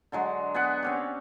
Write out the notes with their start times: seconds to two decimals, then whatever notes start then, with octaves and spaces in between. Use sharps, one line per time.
0.12 D3 F#3 G#3
0.54 B3 G#4 F#5
0.83 C4 C#4 G4